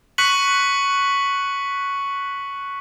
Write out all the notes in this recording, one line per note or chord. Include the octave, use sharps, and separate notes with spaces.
C#6 F#6 B6 C#7 F#7